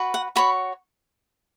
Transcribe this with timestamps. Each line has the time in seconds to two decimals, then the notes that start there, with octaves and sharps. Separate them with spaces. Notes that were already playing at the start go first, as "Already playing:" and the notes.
Already playing: F#4 B4
0.14 F#5
0.36 F#4 C#5 B5